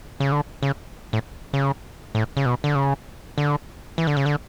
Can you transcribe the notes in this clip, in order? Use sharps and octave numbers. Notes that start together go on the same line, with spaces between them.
C#3
D3
C#3
A2
C#3
A2
C#3
B2
D3
C#3
D3
E3
D3
C#3
D3